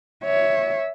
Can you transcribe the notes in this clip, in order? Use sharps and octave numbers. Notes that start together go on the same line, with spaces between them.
C#5 E5